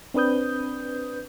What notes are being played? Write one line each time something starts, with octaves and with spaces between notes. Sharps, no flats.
C4 D4 B4 D#6 G6